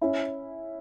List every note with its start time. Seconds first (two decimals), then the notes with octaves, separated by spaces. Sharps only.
0.01 C#4 E4